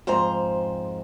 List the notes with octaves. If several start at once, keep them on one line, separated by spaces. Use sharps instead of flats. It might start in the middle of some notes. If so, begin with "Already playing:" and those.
F2 G#2 C5 A#5